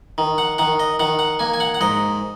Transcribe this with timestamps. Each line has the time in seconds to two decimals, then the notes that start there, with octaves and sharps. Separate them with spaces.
0.18 D#3
0.38 F#5
0.58 D#3 F#5
0.79 D#5
0.99 D#3 F#5
1.19 F#5
1.39 A#3 G#5
1.54 G#5
1.60 F#5
1.74 F#5
1.81 G#2 D#5